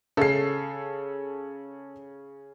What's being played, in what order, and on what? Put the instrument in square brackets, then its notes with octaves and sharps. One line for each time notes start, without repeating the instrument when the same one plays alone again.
[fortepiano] C#3 [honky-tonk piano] A4 C7